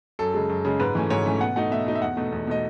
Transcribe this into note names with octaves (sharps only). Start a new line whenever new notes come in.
F#2 A4
C#3 G#3
F#2
C#3 G#3
G#2 B4
E3 A3 C#4
G#2 C#5
E3 A3 C#4
B2 F#5
A3 D#4 F#5
B2 E5
A3 D#4
E5
E2 F#5
B2 A3 D#4
E2
B2 A3 D#4 D#5